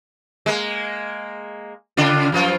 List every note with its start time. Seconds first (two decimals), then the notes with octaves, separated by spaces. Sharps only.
0.46 G#3 A#3
1.97 C#3 D4 F4
2.32 F#2 F3 F4